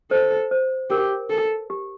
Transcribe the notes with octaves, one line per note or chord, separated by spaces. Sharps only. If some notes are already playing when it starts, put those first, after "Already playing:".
A4 C5
C5
G4 A#4
A4
G4